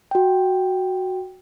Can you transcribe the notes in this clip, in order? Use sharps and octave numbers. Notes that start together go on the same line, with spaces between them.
F#4 G5